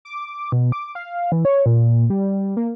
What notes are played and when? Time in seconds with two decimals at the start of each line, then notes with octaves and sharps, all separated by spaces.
0.05 D6
0.52 B2
0.72 D6
0.95 F5
1.32 E3
1.45 C#5
1.66 A#2
2.10 G3
2.57 A#3